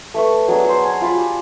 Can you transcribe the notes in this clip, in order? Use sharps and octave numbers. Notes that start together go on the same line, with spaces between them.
A3 B4 C#6
F#3 B3 D4 G#4
F#4 C5
G#5
F4 B5
G4